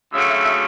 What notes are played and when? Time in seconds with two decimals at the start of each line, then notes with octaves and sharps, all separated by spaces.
0.12 D2 C#3 F#3 A3 E5
0.28 E5
0.44 E5